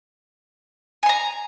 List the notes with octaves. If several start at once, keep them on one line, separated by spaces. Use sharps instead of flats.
G#5 A#5 C6